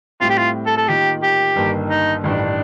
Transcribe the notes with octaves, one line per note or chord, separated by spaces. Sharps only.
A2 G3 C4 F4
G4
F4
A4
A4
D#3 A#3 F4 G4
G4
G1 G2 D#3 A#3
D#4
A1 G2 D#3 D4